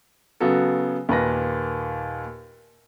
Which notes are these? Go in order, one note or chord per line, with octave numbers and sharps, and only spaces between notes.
C#3 F#3 B3 F#4 A4
D#2 A#2 B4 A#6